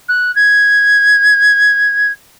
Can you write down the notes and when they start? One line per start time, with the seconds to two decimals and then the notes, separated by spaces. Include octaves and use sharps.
0.08 F#6
0.35 G#6